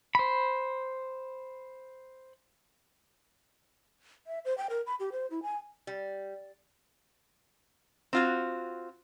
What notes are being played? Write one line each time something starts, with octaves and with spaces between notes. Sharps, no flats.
C5 B5
E5
C5
G5
A#4
B5
G4
C5
E4
G#5
G3
C4 F4 F#4